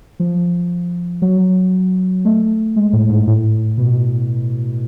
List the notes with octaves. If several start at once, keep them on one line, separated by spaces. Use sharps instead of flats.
F3
F#3
A3
G#3
A2
G#2
A2
B2